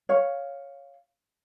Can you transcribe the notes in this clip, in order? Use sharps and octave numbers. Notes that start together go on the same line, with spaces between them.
C#5 F5